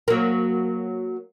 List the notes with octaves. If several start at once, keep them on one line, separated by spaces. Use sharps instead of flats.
F#3 A#3